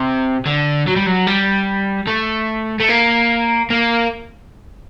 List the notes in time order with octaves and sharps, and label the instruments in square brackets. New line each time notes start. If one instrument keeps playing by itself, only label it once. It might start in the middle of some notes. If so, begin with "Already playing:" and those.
Already playing: [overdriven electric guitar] C3
D3
F#3
G3
F#3
G3
A3
A3
A#3
A#3